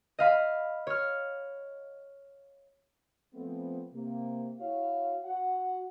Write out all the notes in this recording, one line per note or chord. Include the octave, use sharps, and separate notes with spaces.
D#5 F5 B5
C#5 F6
F3 A3 B3 C4
C3 A#3
E4 F#4 C#5 F5
F#4 F#5